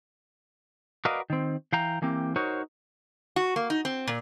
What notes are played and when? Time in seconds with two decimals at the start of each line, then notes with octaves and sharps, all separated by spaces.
1.05 F#4 A#4 B4 D5 D#5 F5
1.30 D#3 C4
1.72 E3 F5 G5 A#5
2.02 E3 A#3 C4 G4
2.36 D#4 F#4 A#4 C5 C#5
3.36 F#4
3.56 A#3
3.70 D#4
3.85 C4
4.07 A#2